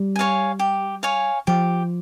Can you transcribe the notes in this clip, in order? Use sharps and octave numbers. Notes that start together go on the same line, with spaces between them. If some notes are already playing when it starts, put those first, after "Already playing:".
Already playing: G3
C#5 F5 G#5
G4
C#5 F5 G#5
F3 G4